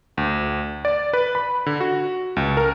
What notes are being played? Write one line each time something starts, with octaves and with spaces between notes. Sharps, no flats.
D2
D5
B4
B5
D3
F#4
C#2
A#4